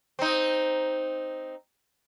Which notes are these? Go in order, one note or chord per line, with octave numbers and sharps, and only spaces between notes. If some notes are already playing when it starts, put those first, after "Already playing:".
C4 D#4